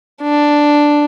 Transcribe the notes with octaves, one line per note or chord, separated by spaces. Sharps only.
D4